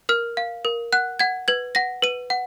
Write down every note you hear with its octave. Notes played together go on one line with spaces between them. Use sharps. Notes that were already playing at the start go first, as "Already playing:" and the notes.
A#4 F6
F5
A#4
F#5 F#6
F#5 G#6
B4 G#6
F#5 A#6
B4 D#7
F#5